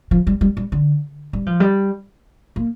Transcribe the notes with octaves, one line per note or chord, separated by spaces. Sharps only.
F3
G3
G3
G3
D3
G3
F3
G3
A#3